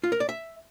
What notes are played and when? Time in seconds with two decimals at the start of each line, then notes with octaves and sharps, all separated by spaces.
0.04 F4
0.12 A#4
0.20 D5
0.29 E5